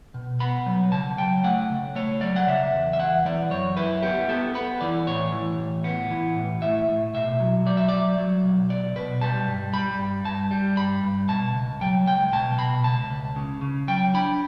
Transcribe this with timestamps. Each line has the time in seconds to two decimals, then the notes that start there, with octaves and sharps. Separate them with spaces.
0.14 B2
0.40 B3 B5
0.66 F#3
0.92 C#3 A5
1.18 F#3 G5
1.44 A3 F#5
1.70 C#3
1.96 A3 C#5
2.21 F#3 D5
2.36 F#5
2.47 C#3 E5
2.73 E2
2.93 E5
2.99 E3 F#5
3.25 E3 D5
3.51 F#2 C#5
3.77 E4 B4
4.03 B3 G4
4.29 B3 A4
4.54 B3 B4
4.81 E3 D5
5.07 A2 C#5
5.33 E3
5.58 A2
5.84 B3
6.11 E3
6.36 A2
6.62 A2 E5
6.88 A2
7.14 B2 E5
7.40 F#3
7.65 F#3 D5
7.77 E5
7.89 F#3 D5
8.18 F#3
8.44 B1
8.69 B1 D5
8.96 B2 B4
9.21 G3 A5
9.47 G2
9.73 G3 B5
9.99 G2
10.25 G2 A5
10.51 G3
10.76 G2 B5
11.03 G2
11.29 B2 A5
11.54 C#2
11.81 F#3 G5
12.07 C#2 G5
12.33 B2 A5
12.58 B2 B5
12.84 C#2 A5
13.10 C#2
13.36 C#3
13.62 C#3
13.88 F#3 G5
14.14 D4 B5